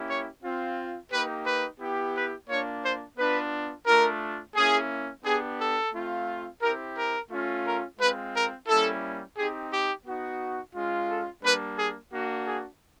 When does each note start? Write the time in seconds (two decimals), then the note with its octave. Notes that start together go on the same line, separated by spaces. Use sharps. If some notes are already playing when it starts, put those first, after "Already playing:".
Already playing: A#3 C#4 E4 G4
0.09 C#5
0.43 C4 F4
1.12 A#3 D#4 G4 B4
1.46 B4
1.80 B3 E4 G4
2.15 B4
2.49 A#3 D4 F4 C#5
2.83 C5
3.17 B3 D4 F4 B4
3.86 A3 D4 F4 A#4
4.56 A#3 C#4 E4 G#4
5.24 B3 D4 G4 G#4
5.59 A4
5.93 A3 C4 F4
6.62 C4 E4 G4 A#4
6.96 A#4
7.30 A3 C#4 F4
7.65 A#4
7.99 G#3 C4 F4 B4
8.34 A#4
8.68 G3 A#3 C#4 E4 A4
9.37 C4 D#4 G4 G#4
9.71 G4
10.06 B3 D#4 F#4
10.74 G#3 C#4 F4
11.09 A4
11.43 G3 A#3 D4 B4
11.77 G#4
12.12 A#3 D4 F#4
12.46 G#4